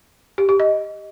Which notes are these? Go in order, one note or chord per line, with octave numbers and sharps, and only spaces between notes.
G4
G4
D#5